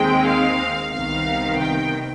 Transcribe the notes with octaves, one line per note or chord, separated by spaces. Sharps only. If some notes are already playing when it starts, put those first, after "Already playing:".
Already playing: D#2 D#3 G#3 C4 G5
F5
C2 C3 D#3 B3 F5
G5